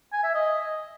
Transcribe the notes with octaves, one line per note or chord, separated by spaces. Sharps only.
G#5
E5
D#5